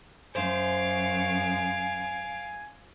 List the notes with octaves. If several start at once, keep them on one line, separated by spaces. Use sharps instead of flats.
F#2 C5 F5 G#5 D7